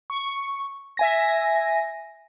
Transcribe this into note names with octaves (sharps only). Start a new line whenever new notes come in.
C#6
E5 G#5 A#6